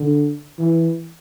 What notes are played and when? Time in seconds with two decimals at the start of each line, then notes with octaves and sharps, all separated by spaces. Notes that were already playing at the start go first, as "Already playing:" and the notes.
Already playing: D3
0.58 E3